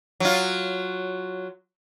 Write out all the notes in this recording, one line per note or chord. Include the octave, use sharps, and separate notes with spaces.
F#3 F4